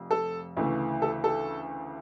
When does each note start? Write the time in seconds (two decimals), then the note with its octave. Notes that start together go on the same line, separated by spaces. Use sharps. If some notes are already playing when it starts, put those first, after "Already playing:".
Already playing: F1 F2
0.11 A4
0.57 D2 C#3 E3 A3
1.02 A4
1.24 A4